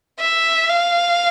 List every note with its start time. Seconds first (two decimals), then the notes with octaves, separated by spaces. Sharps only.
0.20 E5
0.69 F5